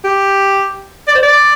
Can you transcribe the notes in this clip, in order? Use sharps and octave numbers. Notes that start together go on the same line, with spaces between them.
G4
D5
C5
D5